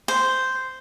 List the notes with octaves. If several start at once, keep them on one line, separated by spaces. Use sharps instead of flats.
C5